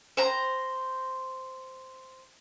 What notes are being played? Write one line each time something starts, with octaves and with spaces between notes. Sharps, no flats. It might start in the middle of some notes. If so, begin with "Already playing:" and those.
C5 A#5